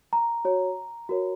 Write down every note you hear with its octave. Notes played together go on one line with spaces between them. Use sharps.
A#5
F#4 C#5
F#4 A#4 C#5